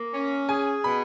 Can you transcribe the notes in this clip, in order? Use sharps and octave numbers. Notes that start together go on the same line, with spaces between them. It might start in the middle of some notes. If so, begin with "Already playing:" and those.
Already playing: A#3
C#4
G#4 G#5
B2 B5